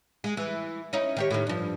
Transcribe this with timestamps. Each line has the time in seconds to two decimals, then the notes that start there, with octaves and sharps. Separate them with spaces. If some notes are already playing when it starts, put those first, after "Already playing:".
0.24 G#3
0.37 E3
0.93 C#4 D#4 E4
1.17 D#3 G4 C#5
1.31 A2 D#3
1.47 G2 F3